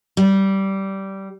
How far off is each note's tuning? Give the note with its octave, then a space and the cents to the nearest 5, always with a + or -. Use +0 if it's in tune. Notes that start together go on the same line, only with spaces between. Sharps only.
G3 -15